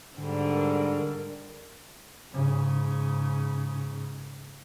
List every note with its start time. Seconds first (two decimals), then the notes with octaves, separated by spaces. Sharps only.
0.17 G#2 D3 G3
0.54 A#4
2.32 G#2 C#3